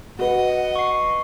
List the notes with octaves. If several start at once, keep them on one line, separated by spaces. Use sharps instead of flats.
F#4 B4 D#5 F#5
C#6 C7